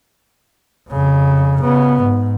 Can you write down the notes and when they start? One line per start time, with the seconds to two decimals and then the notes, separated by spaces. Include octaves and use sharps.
0.89 F2 C#3
1.61 C#3 B3
2.01 G#2